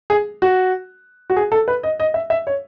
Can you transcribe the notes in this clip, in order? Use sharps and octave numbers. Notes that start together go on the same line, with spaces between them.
G#4
F#4
F#4
G#4
A4
B4
D#5
D#5
E5
E5
C#5